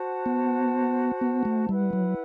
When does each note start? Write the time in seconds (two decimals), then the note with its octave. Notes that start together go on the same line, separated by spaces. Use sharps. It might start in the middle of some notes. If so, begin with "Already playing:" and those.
Already playing: F#4 C5 F#5 A5
0.26 B3
1.21 B3
1.45 A3
1.69 G3 E4 B4 F#5
1.93 F#3